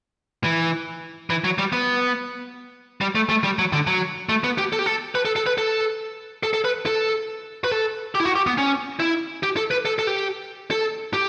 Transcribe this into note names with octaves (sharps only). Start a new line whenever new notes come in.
E3
E3
F#3
G3
B3
G3
A3
A3
G3
F#3
D3
F#3
A3
B3
G4
A4
G4
A4
B4
A4
A4
B4
A4
A4
A4
B4
A4
B4
A4
G4
E4
F#4
G4
B3
C#4
E4
G4
A4
B4
A4
A4
G4
A4
G4